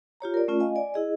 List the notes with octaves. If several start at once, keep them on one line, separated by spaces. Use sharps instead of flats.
F4 G4 C#5 A#5
A#4 D5
A3 C#4 F4
D#5 F5 G#5
D5 G#5
E4 G#4 D#5